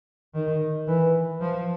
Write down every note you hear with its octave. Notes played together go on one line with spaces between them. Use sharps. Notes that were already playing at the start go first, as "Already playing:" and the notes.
D#3
E3
F3